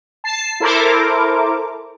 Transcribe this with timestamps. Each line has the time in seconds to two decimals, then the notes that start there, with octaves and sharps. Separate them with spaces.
0.24 A5 C7
0.60 E4 A4 A#4 C5 D6